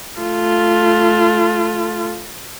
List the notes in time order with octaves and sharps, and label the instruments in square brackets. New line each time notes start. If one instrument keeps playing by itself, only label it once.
[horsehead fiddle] A3 F4